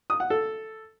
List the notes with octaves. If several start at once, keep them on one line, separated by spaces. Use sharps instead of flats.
D#6
F#5
A4